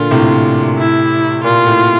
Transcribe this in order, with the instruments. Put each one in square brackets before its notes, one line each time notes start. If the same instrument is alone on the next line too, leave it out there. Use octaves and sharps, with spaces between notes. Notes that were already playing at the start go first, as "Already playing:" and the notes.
Already playing: [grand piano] A#2 D3 [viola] F4
[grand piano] A2 C3
[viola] E4
[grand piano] A#2 [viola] F4
[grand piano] A2